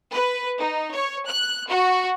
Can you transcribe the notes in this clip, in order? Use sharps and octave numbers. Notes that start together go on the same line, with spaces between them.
B4
D#4
C#5
F#6
F#4